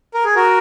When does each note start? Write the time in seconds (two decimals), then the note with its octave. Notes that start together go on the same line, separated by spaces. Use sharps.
0.14 A#4
0.25 G#4
0.35 F#4 A#4